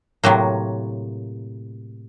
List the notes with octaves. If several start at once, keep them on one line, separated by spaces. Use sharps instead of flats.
A2 C3 F#3 A#3